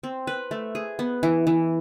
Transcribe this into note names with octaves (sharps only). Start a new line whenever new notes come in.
C4
B4
A3
G#4
B3
E3
E3